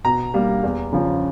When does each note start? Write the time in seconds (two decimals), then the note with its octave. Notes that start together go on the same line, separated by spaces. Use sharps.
0.04 B2 A#5
0.34 G3 A#3
0.63 E2
0.93 C#3 F3